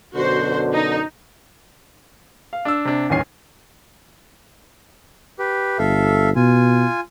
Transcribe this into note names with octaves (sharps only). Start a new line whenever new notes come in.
F#2 B2 D3 F#4 C5
D#4
F5
D4 E6
C3 D4
D1 E2 D#3 C#4 G#5 C7
G4 B4
G1 A4 E5 F5
B2 F4 G#5